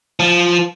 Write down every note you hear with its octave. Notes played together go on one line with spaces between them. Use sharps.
F3